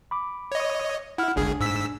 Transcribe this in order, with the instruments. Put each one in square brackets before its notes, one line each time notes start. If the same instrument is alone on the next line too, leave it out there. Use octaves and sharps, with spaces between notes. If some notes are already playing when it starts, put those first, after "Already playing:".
[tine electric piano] B5 D6
[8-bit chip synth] C#5 D#5
[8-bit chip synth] E4 [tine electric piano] F#5 F6
[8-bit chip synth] G1 C#2 G#4 [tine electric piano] D4 G#5
[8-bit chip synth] G#2 E6 B6